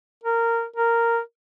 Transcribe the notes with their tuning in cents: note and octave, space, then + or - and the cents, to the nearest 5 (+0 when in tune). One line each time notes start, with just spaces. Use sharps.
A#4 -15
A#4 -5